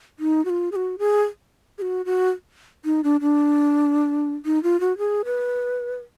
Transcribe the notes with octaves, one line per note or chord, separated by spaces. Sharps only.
D#4
F#4
F4
G#4
F#4
G#4
G#4
F#4
F#4
D#4
D4
D4
D#4
F4
F#4
G#4
B4